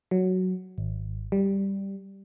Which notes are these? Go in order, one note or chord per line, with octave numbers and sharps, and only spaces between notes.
F#3
G#1
G3